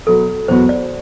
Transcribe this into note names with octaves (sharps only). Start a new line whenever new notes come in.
B2 F#3 B3 A4
E2 B2 F#3 B3 F#4 C5
D5